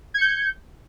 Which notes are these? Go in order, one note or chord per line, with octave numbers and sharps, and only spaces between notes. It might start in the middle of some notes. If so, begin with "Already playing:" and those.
G6 G#6 C#7